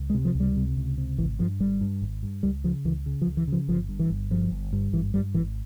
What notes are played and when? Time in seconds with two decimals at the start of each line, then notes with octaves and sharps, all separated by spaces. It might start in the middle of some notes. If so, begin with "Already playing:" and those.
Already playing: C#2
0.10 G#3
0.14 C3
0.25 F3
0.35 C#2
0.40 G3
0.56 C3
0.77 C#2
0.98 C3
1.18 G#1 E3
1.39 G2 F3
1.60 G#1 G3
1.81 G2
2.02 G#1
2.23 G2
2.43 C#2 G3
2.64 C#3 F3
2.85 C#2 E3
3.06 C#3
3.22 F3
3.27 C#2
3.37 E3
3.47 C#3 F3
3.68 G1 F3
3.89 G2
3.99 E3
4.10 G1
4.30 G2 F3
4.51 G1
4.73 G2
4.93 G#1 E3
5.14 G2 G3
5.34 G#1 E3